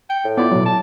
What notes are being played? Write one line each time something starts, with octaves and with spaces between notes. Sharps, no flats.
G5 C#7
A2
B3 E4 F4 D5
B2 F#3
A5